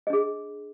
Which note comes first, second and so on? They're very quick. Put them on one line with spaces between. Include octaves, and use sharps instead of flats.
D#5 D4 G#4